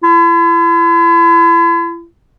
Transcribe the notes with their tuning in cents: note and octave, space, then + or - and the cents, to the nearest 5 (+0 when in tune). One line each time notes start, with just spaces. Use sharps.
E4 +40